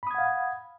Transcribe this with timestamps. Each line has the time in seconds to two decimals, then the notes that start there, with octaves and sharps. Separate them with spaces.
0.03 B5
0.07 D#6
0.11 G#6
0.15 F#5
0.18 F5